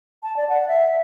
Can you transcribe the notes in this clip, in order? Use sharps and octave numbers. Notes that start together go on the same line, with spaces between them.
A5
D5
F#5
E5